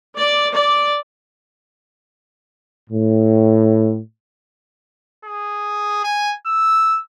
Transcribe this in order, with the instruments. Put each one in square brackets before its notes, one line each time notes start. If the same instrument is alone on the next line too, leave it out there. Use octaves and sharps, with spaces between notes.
[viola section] D5
D5
[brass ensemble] A2
[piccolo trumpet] G#4
G#5
E6